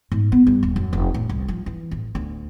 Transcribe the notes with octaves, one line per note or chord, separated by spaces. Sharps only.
G#2
B3
G2
D#1
F#2
F1
A2
C2
F3
E3
A1
D2